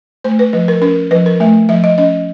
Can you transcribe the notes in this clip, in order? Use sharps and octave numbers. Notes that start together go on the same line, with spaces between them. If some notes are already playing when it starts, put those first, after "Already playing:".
A3 C5
B4
F3 B4
A#4
C#4 A#4
F3 B4
A#4
A3 E5
F3 E5
D#5
C#4 D#5